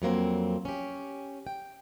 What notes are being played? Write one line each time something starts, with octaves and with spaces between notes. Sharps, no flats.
F2 F#3 A#3 C4
C#4 G4
G5